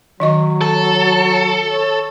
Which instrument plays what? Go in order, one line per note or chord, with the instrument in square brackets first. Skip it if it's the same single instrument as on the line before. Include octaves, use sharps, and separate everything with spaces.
[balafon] D#3 D#5 C#6 [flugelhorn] F#3
[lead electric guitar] A4
[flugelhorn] C#5